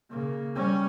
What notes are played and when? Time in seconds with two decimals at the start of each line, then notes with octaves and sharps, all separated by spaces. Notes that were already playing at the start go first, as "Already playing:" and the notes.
0.11 C#3 A#3
0.55 G3 C#4